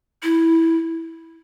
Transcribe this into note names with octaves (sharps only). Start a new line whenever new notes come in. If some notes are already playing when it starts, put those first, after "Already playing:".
E4